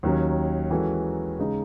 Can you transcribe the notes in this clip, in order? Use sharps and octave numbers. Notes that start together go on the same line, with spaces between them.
D#2 D#3 F#3 C#4
E3 G#3 C#4 F#4 A4
C#3 G#3 D#4